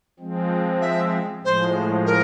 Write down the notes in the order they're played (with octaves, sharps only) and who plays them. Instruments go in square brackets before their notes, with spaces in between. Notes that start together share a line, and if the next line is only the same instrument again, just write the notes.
[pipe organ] F3 G#3 C4
[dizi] E5
[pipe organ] A2 F3 G#3 [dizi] C5
[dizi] A#4